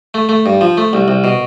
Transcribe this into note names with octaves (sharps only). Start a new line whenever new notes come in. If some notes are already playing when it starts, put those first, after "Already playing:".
A3
A3
G2
F3
A3
C2
C2
B2